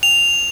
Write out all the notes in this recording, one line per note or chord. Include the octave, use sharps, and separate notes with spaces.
F7